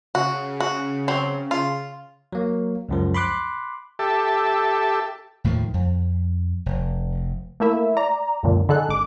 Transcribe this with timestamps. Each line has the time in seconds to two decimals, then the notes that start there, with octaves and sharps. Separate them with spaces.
0.15 C#3 F#4
0.60 F#4
1.08 F#3 C4 C5
1.51 F4
2.33 F#3 A#3
2.89 C#2 F#2 F3
3.14 B5 C6 D6 F#6
3.99 G4 A4 E5 A5
5.44 D#2 A2 D#3 F3
5.74 F2
6.66 F1
7.60 A3 A#3 E4 E5
7.97 D5 A#5
8.43 C#2 F#2 A#2 D3
8.69 D3 D#4 G#4 A4 F#6
8.88 G#1 D6